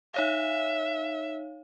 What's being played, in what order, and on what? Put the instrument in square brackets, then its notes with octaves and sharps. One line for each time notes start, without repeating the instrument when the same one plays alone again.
[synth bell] D#4 C#5 F5 [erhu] E5